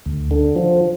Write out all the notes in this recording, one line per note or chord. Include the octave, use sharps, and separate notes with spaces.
D2
D3
F3